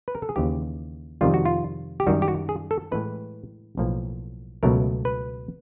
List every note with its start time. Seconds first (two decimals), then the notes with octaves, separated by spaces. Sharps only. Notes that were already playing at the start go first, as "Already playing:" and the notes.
0.08 B4
0.15 A#4
0.22 A4
0.29 G#4
0.36 D#2 C#3 E3 G4
1.21 F2 C3 D#3 G3 F4
1.34 F#4
1.45 F4
2.00 G4
2.07 F#2 D#3 G3 F#4
2.22 G4
2.28 F#4
2.49 G#4
2.71 A4
2.91 A2 E3 G#3 B4
3.77 B1 A2 F3 A#3
4.63 C#2 B2 F#3 A3 A#4
5.05 B4